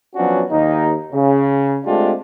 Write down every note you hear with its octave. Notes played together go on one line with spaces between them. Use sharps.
F3 F#3 B3 C#4 D4 F#4
D#2 D#4
C#3
G#3 A3 C4 D4 F4 G4